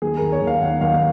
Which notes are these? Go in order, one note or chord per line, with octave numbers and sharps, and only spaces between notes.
D#2 G#4
D#2 A#4
C#5
D#2
F5
D#2 F#5
D#2 F5
F5